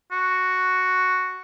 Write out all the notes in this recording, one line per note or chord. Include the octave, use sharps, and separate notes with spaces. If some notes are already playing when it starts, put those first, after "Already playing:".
F#4